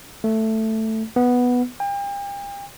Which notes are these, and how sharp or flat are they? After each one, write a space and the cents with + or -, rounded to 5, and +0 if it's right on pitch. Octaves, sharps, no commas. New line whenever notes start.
A3 +5
B3 -5
G5 +40